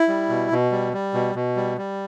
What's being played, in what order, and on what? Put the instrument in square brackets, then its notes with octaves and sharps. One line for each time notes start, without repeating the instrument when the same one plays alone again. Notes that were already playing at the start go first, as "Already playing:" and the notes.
Already playing: [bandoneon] E4
G3
B2
B2
G3
G3
B2
B2
G3
G3